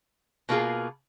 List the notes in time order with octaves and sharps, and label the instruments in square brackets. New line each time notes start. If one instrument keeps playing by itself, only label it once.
[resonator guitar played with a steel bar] B2 A#3 F4 G#4